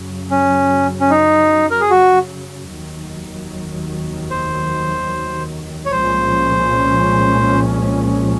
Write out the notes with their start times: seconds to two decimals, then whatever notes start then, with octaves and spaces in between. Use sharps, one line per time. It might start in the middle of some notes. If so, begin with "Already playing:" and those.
Already playing: F#2 C#3 F#3
0.31 C#4
1.00 C#4
1.10 D#4
1.71 A#4
1.81 G#4
1.91 F#4
2.70 F1 D#2 D#3 F#3
4.31 C5
5.86 C#5
5.91 C2 A#2 F3 G#3 C#4 C5